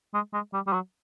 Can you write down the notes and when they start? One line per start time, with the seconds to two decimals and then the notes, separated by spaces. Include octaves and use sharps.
0.14 G#3
0.33 G#3
0.53 G3
0.67 G3
0.73 F#3